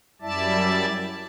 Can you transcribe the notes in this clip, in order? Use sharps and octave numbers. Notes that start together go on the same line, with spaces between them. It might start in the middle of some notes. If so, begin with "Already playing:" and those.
F#2 G3 E4 D5 E5 A5